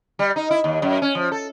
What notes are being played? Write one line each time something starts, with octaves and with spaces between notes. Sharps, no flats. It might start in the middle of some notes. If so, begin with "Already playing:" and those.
G3
D#4
E4
D#2
F#2
C#4
F3
A4